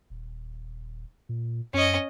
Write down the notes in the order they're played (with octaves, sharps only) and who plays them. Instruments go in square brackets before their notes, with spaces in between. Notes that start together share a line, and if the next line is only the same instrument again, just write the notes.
[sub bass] D#1
A#2
[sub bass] F#2 [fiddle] C#4 D#5